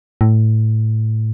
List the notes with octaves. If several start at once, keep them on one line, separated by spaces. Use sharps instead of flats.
A2